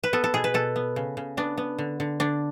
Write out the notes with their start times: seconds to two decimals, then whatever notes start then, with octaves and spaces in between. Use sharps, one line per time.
0.04 B4
0.13 B3 A4
0.24 A4
0.34 B2 G#4
0.44 B4
0.54 B2 A4
0.76 B3
0.96 C#3
1.17 C#3
1.37 B3 D4
1.57 B3
1.79 D3
2.00 D3
2.20 D3 D4